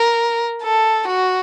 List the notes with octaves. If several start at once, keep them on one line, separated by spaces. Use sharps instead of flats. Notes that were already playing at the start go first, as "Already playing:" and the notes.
Already playing: A#4
A4
F#4